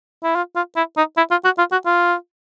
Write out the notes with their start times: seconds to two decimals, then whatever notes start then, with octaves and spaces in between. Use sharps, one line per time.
0.23 E4
0.36 F4
0.56 F4
0.76 E4
0.97 D#4
1.17 E4
1.31 F4
1.44 F#4
1.58 F4
1.72 F#4
1.86 F4